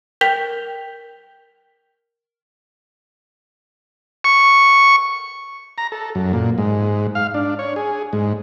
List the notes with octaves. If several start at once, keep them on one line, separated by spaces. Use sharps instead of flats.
A#4 G5 G6 B6 F7 G7
C#6
A#5
A4
F#2
A#2
G#2
F5
D4
C#5
G#4
G#2